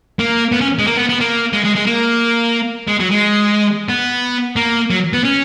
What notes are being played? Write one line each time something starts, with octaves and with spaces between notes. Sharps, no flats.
A#3
B3
C#4
G#3
A#3
B3
B3
A#3
G#3
G#3
G#3
A#3
G#3
F#3
G#3
B3
A#3
F#3
B3
C#4